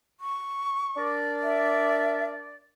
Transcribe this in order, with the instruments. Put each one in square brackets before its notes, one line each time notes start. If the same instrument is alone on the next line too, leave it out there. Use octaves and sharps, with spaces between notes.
[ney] C#6
[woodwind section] D4 A#4 D5
[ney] E5